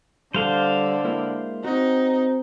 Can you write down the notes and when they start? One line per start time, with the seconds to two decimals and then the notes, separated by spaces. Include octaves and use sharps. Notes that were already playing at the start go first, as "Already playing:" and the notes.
0.34 D3 G3 A4 C5 F5
1.04 G#3 A#3 E4
1.64 C4 D#4 F#4